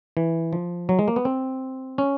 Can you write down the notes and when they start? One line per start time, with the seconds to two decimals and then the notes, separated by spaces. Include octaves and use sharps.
0.17 E3
0.53 F3
0.89 F#3
0.99 G#3
1.08 A#3
1.16 B3
1.25 C4
1.98 C#4